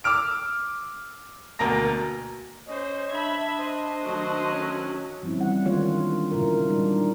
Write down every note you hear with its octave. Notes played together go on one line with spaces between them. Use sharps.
D6 E6 F6 D7
D2 B2 A#3 A#5 A#6
C#4 C5 D#5
D4 E5 B5 G#6
C5 D#5
D#3 F#3 A3
C#4
F3 G3 C4 C#4 E4
E3 G3 F#5
D#3 G#3 A#3 F4 C#5
A#3 D4
A#2 C#3 E4 F4 A#4
G3 G#3 D4 D#4